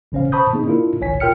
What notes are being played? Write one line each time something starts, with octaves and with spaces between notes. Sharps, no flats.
A1 C#3 C#4 C5 F5
C5 A5 B5 C#6 D#6 G6
A#3 C4 D#4 G#4
D4 E4 F4 A#4
G#1 C#2 C#5 G#5 B6
F4 A#4 G5 F6 C#7